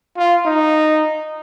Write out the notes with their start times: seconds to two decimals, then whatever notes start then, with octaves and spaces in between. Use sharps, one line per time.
0.17 F4
0.46 D#4